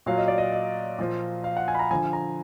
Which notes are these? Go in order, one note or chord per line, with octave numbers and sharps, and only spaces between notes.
A#2 F#3 F5
D#5
D5
D#5
D#5
A#2 F3
F5
F#5
G#5
B5
A#5
D3 F3 G#5
A#5